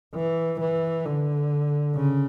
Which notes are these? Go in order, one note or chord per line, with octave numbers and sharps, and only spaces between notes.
E3
E3
D3
C#3